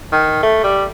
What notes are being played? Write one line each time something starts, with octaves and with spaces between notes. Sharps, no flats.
D#3
A3
G3